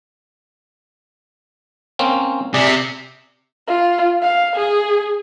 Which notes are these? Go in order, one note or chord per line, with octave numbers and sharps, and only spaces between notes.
A#3 C4 C#4
C3 G#4 D5
F4
F5
G#4